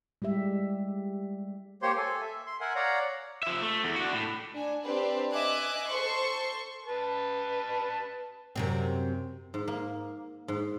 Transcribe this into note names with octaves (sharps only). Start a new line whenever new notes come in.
G3 G#3 G4 E5
A#3 G4 C5 C#5 C6
A4 G#5
E5
C6
A#4 E5 F#5 G#5
C#5 D5 F5 F#5 A#5
F3 E5
A3
E2
D4 F#4
A2
D4 G#5
C4 D4 G4 B4 D5
D#5 E5 G#5 D6 F#6
A4 C5 C6 C#6
B4 A5
F#2 C3 C4
G#2
A#3
G#2